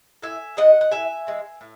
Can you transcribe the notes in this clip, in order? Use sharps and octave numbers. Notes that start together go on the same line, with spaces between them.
A2 E5 G#5
E3 G#3 D#5 F#5
F#5
A2 E5 G#5
E3 G#3
A2